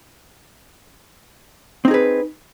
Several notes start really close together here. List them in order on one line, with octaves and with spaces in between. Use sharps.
C4 D#4 G#4 B4